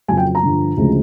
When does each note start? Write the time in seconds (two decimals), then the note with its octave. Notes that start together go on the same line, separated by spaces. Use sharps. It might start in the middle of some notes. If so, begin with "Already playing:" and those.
0.08 F2 C#3 F#3 G#5
0.17 G5
0.35 A#5
0.43 G2 D3 F3
0.77 D2 C#3 F3 G#3